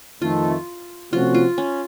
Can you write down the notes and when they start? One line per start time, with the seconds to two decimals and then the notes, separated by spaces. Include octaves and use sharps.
0.22 F2 D#3 A3 F4
1.12 C3 F3 A3 C#4 F4 F#4
1.34 F4
1.58 C#4